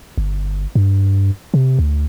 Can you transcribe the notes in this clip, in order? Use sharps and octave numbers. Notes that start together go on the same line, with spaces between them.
G1
G2
C3
D2